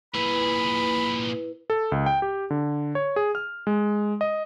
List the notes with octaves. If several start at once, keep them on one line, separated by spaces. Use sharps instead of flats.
A#2 E4 G#4 B4 B5
A4
C#2
G5
G4
D3
C#5
G#4
F6
G#3
D#5